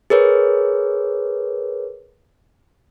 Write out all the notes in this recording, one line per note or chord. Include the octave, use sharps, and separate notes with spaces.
G#4 A#4 B4 C#5